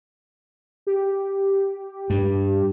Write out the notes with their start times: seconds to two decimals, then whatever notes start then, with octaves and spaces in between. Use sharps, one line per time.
0.87 G4
2.10 G2